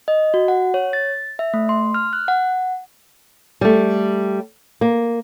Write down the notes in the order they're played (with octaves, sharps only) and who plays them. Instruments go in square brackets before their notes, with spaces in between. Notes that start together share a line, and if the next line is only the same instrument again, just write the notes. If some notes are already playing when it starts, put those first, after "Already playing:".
[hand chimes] D#5
F#4
F#5
C#5
A6
E5
A3
C6
F6
F#6
F#5
[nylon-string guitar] G3 A3
A#3